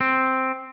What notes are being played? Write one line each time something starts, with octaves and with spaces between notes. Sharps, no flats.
C4